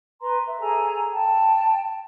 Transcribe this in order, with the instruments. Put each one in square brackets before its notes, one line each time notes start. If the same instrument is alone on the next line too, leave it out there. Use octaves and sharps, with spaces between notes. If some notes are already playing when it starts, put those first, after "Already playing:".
[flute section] B4 A#5 C6
E5
G#4 A4 G#5 A#5
G5 A5